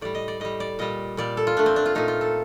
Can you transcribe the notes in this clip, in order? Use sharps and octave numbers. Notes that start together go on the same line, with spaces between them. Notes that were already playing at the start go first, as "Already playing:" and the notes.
A2 G3 D5
D#5
D5
A2 G3 D#5
D5
A#2 G3 D#5
A#2 G3 D5
A4
F4
A#2 A3 D4
C4
D4
F4
A#2 A3 D#4
F4
A4